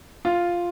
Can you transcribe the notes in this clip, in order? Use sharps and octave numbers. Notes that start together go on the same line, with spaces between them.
F4